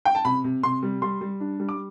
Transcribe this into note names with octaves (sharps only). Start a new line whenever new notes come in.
G5
A5
C3 B5
C3
C3 C6
G3
G3 C6
G3
D4
G3
D6